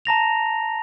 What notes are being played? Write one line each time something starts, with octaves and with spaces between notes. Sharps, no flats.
A5 A#5 A#6 F7